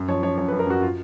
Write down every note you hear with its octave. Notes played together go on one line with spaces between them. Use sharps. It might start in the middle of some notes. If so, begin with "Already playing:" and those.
Already playing: F#2
F3 C#5
F3 C#5
F#2 C#5
B4
F#2
A#4
F#2 F#4
F4